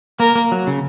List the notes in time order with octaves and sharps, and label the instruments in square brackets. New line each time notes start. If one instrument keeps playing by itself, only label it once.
[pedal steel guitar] A#3 [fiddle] A#4
[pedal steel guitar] A#3
F#3
C#3